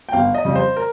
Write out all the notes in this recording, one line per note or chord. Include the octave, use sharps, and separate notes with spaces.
G5
G1 F5
D#5
F2 C#3 G3
C5
A#4